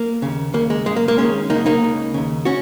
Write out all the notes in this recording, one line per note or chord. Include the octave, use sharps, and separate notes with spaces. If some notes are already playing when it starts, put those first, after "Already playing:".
Already playing: A#3
D#2 C#3
D#2 C#3 A#3
G#3
F#2 C#3 G#3
A#3
A#3
D#2 D#3 G#3 C#4
F#2 C#3 A#3 D#4
A#3 D#4
C#2 C#3
D#2 C#3
C#4 F#4